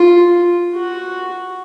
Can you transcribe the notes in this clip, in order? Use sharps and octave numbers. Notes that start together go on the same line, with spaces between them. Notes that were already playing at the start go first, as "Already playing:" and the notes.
Already playing: F4
F#4